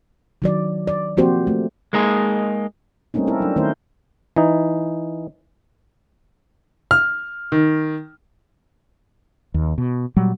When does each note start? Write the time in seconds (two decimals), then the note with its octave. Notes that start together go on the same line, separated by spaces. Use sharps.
0.42 D#3 F#3 D5
0.87 D5
1.17 F3 A#3 C4 F#4 G4 C5
1.47 A3
1.93 G#3 A#3 D#4 G#4
3.14 G3 A3 A#3 C4 C#4 D#4
3.27 C4 E4 A4 A#4
3.40 F#3 D4
3.56 D#3 A3 C#4 E4 A#4 C5
4.36 E3 D#4
6.91 F6
7.52 D#3
9.54 D#2
9.78 B2
10.17 A#2 F#3 G3